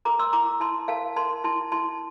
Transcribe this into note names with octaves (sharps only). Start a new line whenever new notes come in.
A#4 A#5 D6
C6 E6
E4 A#5 D6
E4 A5 C6
A#4 F5 A5
A#4 A5 C6
E4 A5 C6
E4 A5 C6